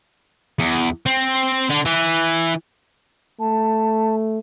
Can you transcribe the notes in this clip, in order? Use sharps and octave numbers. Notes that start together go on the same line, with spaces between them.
E2
C4
D3
E3
A3 A5